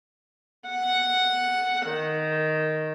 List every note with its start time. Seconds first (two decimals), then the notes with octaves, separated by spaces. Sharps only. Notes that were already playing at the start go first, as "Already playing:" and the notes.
0.69 F#5
1.89 D#3